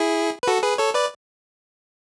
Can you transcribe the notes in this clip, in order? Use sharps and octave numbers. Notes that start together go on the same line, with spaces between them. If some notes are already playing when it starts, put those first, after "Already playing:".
Already playing: E4 G#4
B4
F#4 A4
G#4 B4
A4 C#5
B4 D5